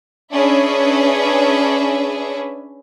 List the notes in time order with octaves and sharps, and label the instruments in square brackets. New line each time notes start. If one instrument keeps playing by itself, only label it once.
[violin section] C#4 D4 G#4 B4 E5